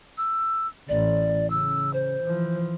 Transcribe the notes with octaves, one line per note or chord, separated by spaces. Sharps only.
E6
A1 D5
C#3 E6
C5
E3 F3